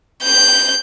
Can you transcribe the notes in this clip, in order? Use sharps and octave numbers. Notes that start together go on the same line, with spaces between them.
G6